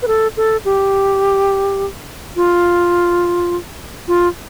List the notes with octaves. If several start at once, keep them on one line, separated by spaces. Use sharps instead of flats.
B4
A4
A4
G4
F4
F4